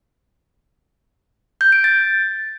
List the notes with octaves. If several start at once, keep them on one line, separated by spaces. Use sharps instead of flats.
G6
D7
A6